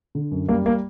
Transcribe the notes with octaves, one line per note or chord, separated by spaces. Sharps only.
D3
F#2
G3 A#3
A#3